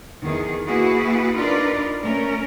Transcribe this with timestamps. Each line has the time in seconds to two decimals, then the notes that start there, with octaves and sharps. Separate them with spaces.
0.22 E2 D#3 G#4
0.66 A#3 E4 F#4 G#4 B4
1.36 D4 D#4 F4 A#4 B4 D5
2.02 A3 C#4 A#4